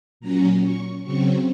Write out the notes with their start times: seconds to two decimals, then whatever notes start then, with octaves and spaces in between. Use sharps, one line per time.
0.20 A#2 F#3 C#4 A#5
0.62 C#6
1.04 C#3 F#3 C4 C#6